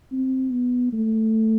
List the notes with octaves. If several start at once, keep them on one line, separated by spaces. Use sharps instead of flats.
C4
B3
A3